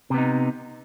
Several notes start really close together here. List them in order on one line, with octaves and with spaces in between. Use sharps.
C3 B3 D#4